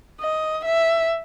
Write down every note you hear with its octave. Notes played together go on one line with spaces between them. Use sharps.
D#5
E5